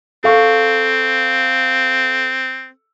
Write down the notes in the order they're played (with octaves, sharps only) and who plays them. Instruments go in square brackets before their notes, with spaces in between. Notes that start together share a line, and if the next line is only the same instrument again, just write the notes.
[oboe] C4 [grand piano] A4 F5 C#6